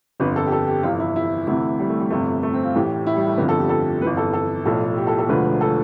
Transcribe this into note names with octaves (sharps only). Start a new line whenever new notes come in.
G1 F2 D3 B4
A4
G4
A4
G4
G1 F2 C3 E3 F4
E4
E4
D2 C3 E3 E4
G3
A3
G3
G1 F2 C3 A3
A3
C4
F4
A1 A2 E3 G4
E4
G3
A3
G1 F2 D3 F3 B3
A4
G4
A4
G1 F2 E3 B4
A4
A4
B1 A2 F3 A4
G4
A4
A4
E1 D2 D3 F3 B4
A4